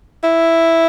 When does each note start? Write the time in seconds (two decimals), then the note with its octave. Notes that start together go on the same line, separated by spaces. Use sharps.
0.24 E4